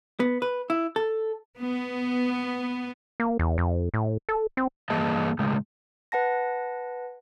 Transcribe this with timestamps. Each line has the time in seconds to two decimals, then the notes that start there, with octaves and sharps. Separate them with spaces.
0.20 B3
0.42 B4
0.70 E4
0.96 A4
1.58 B3
3.20 A#3
3.39 E2
3.58 F2
3.94 A2
4.29 A4
4.57 C4
4.90 G2 E3 A#3 G#4 D#5 A5
5.39 A2 C#3 G#3
6.12 B4 F#5 A5 A#6